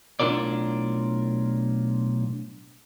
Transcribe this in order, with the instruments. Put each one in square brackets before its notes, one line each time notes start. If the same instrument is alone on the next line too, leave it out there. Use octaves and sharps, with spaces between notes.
[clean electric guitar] B1 A2 D4 F4 A#4 D5